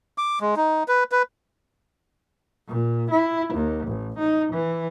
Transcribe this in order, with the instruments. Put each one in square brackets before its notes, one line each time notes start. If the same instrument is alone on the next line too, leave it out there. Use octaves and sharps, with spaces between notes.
[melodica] D6
G#3
D#4
B4
B4
[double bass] A#2
E4
D#2
A1
D#4
E3